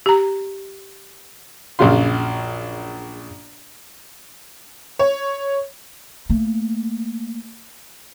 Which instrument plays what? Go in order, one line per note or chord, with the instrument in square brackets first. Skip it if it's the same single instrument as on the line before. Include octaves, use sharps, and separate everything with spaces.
[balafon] G4 A#5
[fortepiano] A#1 F#2 C#3 F4 C6
[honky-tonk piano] C#5
[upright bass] A3 A#3